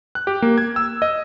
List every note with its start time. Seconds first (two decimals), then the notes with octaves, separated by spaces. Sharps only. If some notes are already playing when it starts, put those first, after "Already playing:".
0.15 F#6
0.27 G4
0.42 A#3
0.58 G#6
0.76 E6
1.02 D#5